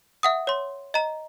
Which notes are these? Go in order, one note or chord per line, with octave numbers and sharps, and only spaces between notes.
E5 F#5 D#6
C#5 C6
D#5 A#5